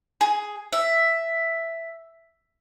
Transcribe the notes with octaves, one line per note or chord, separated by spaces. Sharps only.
G#4
E5